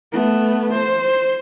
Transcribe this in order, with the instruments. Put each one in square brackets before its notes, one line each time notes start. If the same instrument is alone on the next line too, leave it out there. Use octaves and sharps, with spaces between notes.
[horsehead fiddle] A3 B3
C5